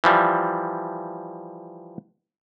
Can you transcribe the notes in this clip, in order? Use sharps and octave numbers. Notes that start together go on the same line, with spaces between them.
E3 F3 G3